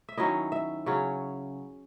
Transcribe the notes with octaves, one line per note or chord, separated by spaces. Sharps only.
E5
D#3 F#3 C#4 E4 D#5
E5
C#3 F#3 C#4